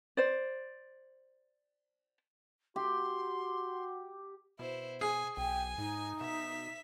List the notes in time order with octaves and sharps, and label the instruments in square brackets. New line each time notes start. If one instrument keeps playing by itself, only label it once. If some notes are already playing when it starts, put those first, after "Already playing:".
[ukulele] C5 D5
[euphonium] F#4 [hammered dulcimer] G4 [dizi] C6
[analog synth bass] B2 [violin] E4 C5
[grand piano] G#4 [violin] G#5
[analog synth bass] B1 [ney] G5 [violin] G#5
[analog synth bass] G#2 [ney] D#4
[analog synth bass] B2 [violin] E5 B6